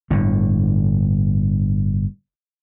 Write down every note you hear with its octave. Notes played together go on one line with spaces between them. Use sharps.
G1 A2 D3